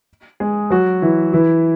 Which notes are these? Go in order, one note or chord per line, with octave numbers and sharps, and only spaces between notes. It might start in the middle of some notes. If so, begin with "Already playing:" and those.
G#3 G#4
F#3 F#4
E3 E4
E3 E4